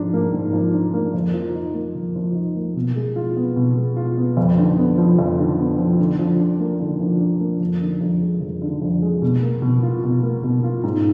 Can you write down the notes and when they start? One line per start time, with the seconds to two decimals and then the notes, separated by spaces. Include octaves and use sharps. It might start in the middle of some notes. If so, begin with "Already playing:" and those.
Already playing: G#2 F3 D4
0.13 A#3
0.33 G#2
0.53 F3
0.74 D4
0.94 A#3
1.14 F2
1.34 F3
1.55 D#4
1.74 A#3
1.95 F2
2.16 F3
2.35 D#4
2.56 A#3
2.76 B2
2.96 G#3
3.16 F4
3.37 B3
3.56 B2
3.76 G#3
3.96 F4
4.17 B3
4.37 F2
4.58 D3
4.77 B3
4.98 F3
5.19 F2
5.38 D3
5.58 B3
5.78 F3
5.99 D3
6.19 F3
6.40 D4
6.60 A#3
6.80 D3
7.00 F3
7.20 D4
7.40 A#3
7.60 F2
7.81 D3
8.01 F2
8.21 G#3
8.41 F2
8.62 D3
8.82 F2
9.02 G#3
9.22 B2
9.42 A#3
9.62 B2
9.83 F4
10.04 B2
10.23 A#3
10.44 B2
10.64 F4
10.84 G#2